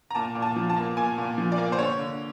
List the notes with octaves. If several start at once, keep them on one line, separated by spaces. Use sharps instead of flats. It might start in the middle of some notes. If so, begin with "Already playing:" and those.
A#5
A#2 A5
A#2
A5
F3
A5
A#3
A#2 G#5
A#2
F3
D5
A#3
C5
D3 C#5
D3